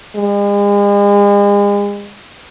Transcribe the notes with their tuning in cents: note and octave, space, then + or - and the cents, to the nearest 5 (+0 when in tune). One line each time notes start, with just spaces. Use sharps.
G#3 -40